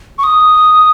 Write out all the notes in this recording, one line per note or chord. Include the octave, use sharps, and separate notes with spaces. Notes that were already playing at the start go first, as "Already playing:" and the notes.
C#6
D#6